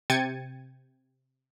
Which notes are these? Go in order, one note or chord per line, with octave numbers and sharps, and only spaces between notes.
C3 G5 G#6 A6 C#7 D#7